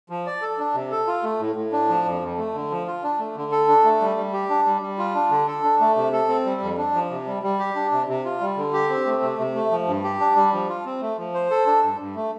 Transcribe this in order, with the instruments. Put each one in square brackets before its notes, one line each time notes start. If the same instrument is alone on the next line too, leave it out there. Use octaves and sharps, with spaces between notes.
[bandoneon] F3
D5
A4
D4
C3
A4
F4
A3
A2
A2
D4
F3
F2
F2
A3
D3
F3
F4
D4
A3
D3
A4
D4
A3
G3
G3
G4
D4
G3
G3
F4
D4
D3
A4
D4
A3
C3
A4
C4
G3
F2
D4
F3
C3
G3
G3
G4
D4
C3
C3
F4
G3
D3
G4
C4
A3
C3
C3
A3
F3
G2
G4
D4
G3
F3
F4
C4
A3
F3
C5
A4
D4
G2
G2
A3